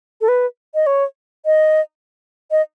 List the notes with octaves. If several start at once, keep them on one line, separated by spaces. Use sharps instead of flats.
A4
B4
D#5
C#5
D#5
D#5